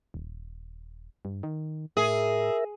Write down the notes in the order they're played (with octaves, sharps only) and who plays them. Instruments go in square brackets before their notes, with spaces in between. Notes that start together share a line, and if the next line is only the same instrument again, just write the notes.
[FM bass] D#1
G2
D#3
[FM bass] A2 [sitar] G#4 [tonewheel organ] A#4 E5